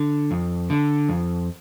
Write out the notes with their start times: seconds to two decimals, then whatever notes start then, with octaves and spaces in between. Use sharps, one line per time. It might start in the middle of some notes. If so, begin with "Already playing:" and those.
Already playing: D3
0.31 F2
0.70 D3
1.09 F2